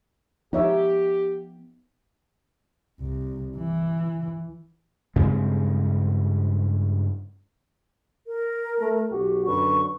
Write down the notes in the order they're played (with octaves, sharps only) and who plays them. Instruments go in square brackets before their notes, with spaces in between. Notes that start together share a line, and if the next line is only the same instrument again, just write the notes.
[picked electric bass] F3 B3 [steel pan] D#4 C#5 E5 [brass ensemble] G4
[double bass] C2
E3
[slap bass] G2 C#3 G#3 C4
[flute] A#4
[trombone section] A3
B1 F#4 G4
[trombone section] F#2 D3 B4 [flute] C#6